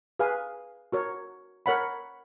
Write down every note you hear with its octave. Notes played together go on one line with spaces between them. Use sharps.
G#4 B4 F5 G#5
F#4 A#4 C#5
A#4 C#5 F#5 B5